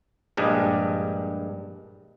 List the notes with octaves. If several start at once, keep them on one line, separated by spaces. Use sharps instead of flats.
A#1 G2 G3 G#3